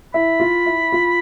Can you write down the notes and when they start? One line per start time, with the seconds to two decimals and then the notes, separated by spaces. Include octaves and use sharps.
0.14 E4 B5
0.40 F4
0.66 E4
0.92 F4